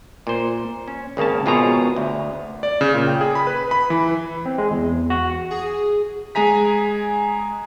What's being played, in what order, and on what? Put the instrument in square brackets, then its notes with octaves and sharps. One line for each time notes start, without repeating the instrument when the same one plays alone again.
[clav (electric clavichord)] A#2 C5
C#4
G#1 C#3 A#3 C#4 A5
G#1 B2 F4 G#4 C#5 A#5
D2
[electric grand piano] D5
C#3
A#2
G5
G#4
B5
B4
B5
E3
[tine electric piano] C4
G#3
E2
F#4
[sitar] G#4
[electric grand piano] G#3 G#4 G#5 A#5 B6